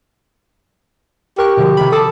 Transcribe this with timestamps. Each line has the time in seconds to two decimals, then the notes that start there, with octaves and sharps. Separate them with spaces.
1.38 G4 A#4 C#6 F#6
1.57 B2 D3 F3
1.77 C3 D#3 B5
1.92 A4 A5 D6 D#6